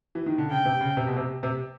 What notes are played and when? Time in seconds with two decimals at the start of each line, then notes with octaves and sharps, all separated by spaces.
0.15 E3
0.26 D#3
0.38 D3
0.50 C#3 G5
0.65 C3
0.81 C#3
0.97 C3
1.07 B2
1.16 C3
1.43 C3